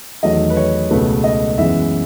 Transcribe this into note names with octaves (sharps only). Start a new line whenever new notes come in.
E2 D#3 F#3 A3 D#5
B4
C#5
C#2 B2 A3 B4
D#5
F#2 E3 G#3 B3 E5